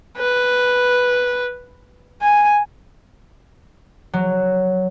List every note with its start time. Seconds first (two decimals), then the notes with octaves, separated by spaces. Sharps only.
0.18 B4
2.22 G#5
4.13 F#3